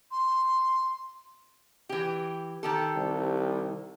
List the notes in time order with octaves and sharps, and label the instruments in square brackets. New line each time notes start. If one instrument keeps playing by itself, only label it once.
[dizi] C6
[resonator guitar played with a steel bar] E3 G4
D#3 G4 A4
[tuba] C2